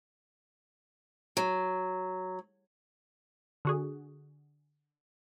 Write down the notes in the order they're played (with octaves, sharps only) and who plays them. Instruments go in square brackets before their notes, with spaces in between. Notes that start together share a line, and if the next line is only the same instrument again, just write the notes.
[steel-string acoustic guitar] F#3
[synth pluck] D3 F#4 G#4